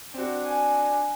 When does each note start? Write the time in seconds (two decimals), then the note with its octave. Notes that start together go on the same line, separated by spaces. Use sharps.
0.14 C4 D4 F#4
0.45 G#5